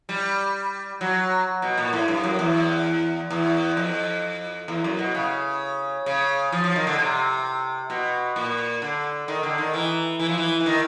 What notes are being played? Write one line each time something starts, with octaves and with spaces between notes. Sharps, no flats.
G3
F#3
B2
A#2
A2
G2
F#2
E2
E2
F2
E2
F#2
B2
C#3
C#3
F3
F3
D#3
D3
C3
B2
A#2
D3
D#3
D3
D#3
E3
E3
F3
E3
E3
D#3